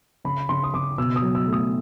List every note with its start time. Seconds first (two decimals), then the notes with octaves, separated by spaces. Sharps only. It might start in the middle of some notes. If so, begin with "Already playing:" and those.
0.24 C#3 B5
0.49 C#3 C6
0.64 D#6
0.74 C#3 D6
0.98 B2 E6
1.16 D#6
1.22 F#3
1.35 E6
1.47 A3
1.53 D#6